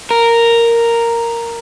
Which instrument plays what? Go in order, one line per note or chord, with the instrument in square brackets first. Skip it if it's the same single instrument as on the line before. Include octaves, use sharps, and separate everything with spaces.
[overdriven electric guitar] A#4